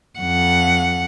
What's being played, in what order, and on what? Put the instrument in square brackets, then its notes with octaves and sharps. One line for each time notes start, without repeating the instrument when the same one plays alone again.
[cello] F2 F#5